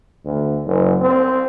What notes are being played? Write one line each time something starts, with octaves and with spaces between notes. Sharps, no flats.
D2
F#1
C4